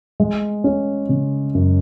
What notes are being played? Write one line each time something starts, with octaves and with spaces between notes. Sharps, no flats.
G#3
C#4
C#3
F#2